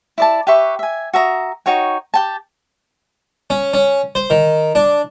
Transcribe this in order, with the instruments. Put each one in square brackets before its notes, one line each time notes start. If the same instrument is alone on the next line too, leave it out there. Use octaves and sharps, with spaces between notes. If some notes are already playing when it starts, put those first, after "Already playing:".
[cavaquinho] E4 D5 A5
G4 B4 E5 C#6
E5 G#5
F#4 E5 A#5 D#6
D#4 F#4 C#5 G5
G4 G5 A5
[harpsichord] C#4
C#4
C5
D#3
D4